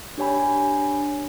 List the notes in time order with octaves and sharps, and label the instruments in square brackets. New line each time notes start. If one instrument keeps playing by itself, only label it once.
[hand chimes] D4 G4 C#5 G#5 B5